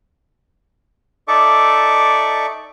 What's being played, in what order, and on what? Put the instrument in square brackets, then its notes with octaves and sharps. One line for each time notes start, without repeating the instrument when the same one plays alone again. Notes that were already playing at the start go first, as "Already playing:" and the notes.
[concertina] D#4 A4 D5 E5 C#6 D6